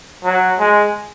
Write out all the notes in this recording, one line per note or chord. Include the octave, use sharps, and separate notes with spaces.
F#3
G#3